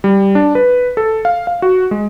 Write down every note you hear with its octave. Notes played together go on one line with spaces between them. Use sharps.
G3
D4
B4
A4
F5
F5
F#4
G#3